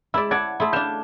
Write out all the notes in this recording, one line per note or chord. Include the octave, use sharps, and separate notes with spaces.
G#3 E4 D5 B5 E6
D5 F#5 A5 G#6
A3 E4 C6 D#6
D4 F5 G6 E7